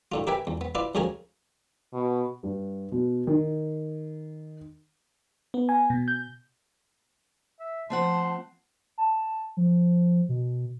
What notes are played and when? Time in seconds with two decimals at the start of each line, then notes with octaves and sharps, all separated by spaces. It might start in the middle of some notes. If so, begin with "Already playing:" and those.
0.12 A2 D3 F4
0.27 G4 A#4 B4 E5 G5 G#5
0.47 E2
0.61 B3
0.75 E4 F4 B4 D5
0.95 D2 F3 C#4 G#4 A#4 G#5
1.93 B2
2.43 G2
2.92 B2
3.27 D#3
5.54 B3
5.69 G#5
5.90 B2
6.08 G6
7.60 E5
7.90 F3 A3 C4 F#5 A5 C6
8.98 A5
9.57 F3
10.29 B2